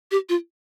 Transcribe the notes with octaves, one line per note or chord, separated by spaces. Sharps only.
G4
F4